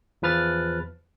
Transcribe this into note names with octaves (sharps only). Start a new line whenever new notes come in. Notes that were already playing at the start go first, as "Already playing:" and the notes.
E2 F3 B4 F6 A6